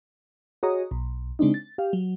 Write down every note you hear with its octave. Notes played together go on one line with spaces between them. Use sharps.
F#4 G#4 C#5 D#5 A#5 D#6
B1
C#3 G#3 C4 D4 D#4
A6
G4 F5
F#3